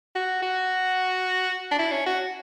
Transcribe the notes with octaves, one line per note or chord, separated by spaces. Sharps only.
F#4
F#4
D4
E4
C#4
F#4